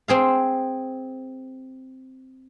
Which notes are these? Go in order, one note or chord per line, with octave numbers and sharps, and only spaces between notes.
C4 G#4 F5